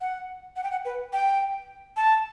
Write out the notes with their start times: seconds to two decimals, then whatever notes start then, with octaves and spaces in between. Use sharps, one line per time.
0.01 F#5
0.56 F#5
0.63 G5
0.71 F#5
0.85 B4
1.13 G5
1.97 A5